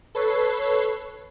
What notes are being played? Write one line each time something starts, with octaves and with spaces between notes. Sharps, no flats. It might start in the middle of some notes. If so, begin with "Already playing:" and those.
A4 B4 C#5 C7